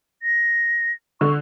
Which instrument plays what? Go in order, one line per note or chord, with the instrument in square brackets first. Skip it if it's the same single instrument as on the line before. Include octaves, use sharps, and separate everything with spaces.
[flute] A#6
[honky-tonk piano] D3 [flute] C#6